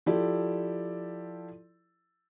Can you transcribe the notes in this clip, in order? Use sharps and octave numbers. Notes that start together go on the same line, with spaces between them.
F3 E4 G4 A4 D5